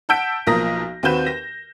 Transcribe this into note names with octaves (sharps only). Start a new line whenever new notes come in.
F#5 A5 E6 G6 B6 D7
B1 F3 A#3 A#5 D#6 A#6
D#2 C4 F#4 B4 G6 E7
A#6